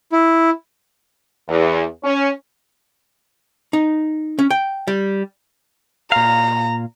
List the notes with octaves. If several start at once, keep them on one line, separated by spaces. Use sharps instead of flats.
E4
E2
C#4
D#4
C#4
G5
G3
A#2 F5 A#5